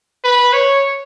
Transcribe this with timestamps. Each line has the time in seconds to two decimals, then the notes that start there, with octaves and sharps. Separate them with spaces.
0.25 B4
0.53 C#5